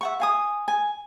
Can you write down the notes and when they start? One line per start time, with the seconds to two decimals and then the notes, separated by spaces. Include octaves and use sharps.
0.01 E5 F#5 C#6
0.20 F5 G#5 D#6
0.68 G#5